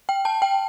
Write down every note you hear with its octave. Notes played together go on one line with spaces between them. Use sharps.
G5
A5
G5